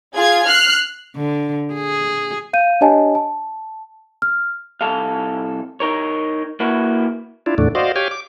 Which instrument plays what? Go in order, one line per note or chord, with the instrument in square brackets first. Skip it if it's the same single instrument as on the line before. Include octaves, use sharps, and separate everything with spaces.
[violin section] F4 G#4 G#6
F6 F#6 C7
[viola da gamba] D3
G#4
[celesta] F5 G6 D#7
D4 G4 C#5 D#5 G#5 A5
A5
F6
[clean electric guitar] C2 A4 F5
D#4 A#4 C#5
A#3 E4 F#4 B4
[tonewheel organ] D4 E4 F4
E2 A2 D3 A3 D4
F#4 C5 D5 D#5 F5
G4 C#5 F5 G5 G#5
D6